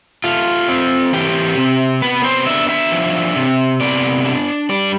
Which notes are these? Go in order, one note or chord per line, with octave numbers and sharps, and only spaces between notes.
A3 F4
C4
E3 G4
C3
B3 B4
C5
D4 E5
E5
F3
C3
B3 D5
D4
G3 D5